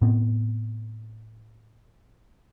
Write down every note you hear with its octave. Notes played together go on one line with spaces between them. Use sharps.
A2 B3 C4